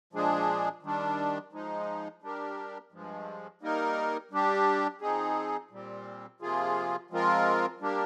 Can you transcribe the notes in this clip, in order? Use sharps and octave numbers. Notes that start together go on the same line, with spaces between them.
A#2 F3 G#3 D4 G#4
D#3 G3 D4
F3 G#3 D#4
G3 D4 G4 A#4
G2 F3 G#3
G3 A#3 D#4 A#4
G3 D4 G4
F3 C4 D#4 G#4
A#2 G3 C4
C3 F3 A#3 F4 G#4
F3 G#3 C4 F4 A#4
G3 A#3 D4 G4 A#4